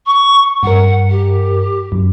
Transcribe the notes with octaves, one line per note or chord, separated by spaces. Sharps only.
C#6
G2 A#4 F#5
G4
F#2